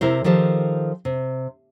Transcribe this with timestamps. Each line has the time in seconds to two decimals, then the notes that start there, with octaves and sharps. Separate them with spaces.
0.01 C3 E4 A#4 C5
0.24 D#3 F3 G4 A4 C5
1.05 C3